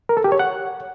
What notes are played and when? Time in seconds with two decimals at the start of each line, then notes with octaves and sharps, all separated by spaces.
0.09 A#4
0.17 A4
0.24 G4
0.32 C#5
0.39 F#5